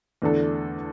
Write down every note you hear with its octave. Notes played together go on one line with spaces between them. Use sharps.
E2 D3 A3 D4 A4